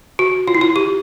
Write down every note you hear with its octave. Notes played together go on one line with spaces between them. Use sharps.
F#4
F4
E4
F4
G4